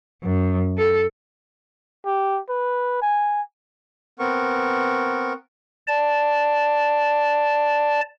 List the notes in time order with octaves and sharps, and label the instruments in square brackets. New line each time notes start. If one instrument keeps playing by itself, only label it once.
[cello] F#2
A4
[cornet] G4
B4
G#5
[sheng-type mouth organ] B3 C4 A#4 C#6
[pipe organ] D5 A5